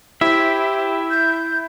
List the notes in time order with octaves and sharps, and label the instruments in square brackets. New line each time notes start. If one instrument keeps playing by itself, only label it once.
[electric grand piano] E4 [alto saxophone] G4 [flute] C5 [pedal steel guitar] E5
[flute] G6